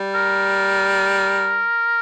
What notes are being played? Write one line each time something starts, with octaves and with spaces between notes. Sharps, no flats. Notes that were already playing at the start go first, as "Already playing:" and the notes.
Already playing: G3
A#4